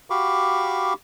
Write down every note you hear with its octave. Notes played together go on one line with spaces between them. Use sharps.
F#4 G4 F5 B5 C#6 D6